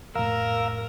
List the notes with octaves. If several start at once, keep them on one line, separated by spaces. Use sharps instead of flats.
F2 A2 A#4 F5 A#5 E6